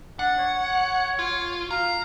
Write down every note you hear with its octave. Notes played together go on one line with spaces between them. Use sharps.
D4 F#5
C#5
F4
F5 A#5